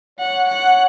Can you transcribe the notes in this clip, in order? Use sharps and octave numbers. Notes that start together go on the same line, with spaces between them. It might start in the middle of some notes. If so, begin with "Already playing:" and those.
C#5 F#5
F#5